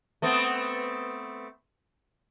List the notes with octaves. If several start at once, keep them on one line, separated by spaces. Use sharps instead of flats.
A3 B3 C4